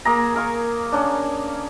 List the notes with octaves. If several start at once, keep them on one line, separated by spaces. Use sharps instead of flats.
A#3 G#4 A#5
G#4 A#4 F5 C#6
C#4 D4